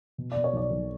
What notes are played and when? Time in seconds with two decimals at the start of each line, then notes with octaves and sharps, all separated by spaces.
0.18 B2
0.32 B2 D5
0.44 C#5
0.53 B1 D5
0.71 B1